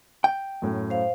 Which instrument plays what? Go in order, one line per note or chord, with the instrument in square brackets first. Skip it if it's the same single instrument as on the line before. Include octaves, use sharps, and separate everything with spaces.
[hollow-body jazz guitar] G5
[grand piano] F#2 A2
[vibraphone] C5 F5